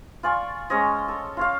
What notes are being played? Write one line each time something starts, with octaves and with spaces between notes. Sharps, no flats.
F4 D5 G#5 C#6
G#3 C#4 C#5 D#5
A4
F4 C#5 F5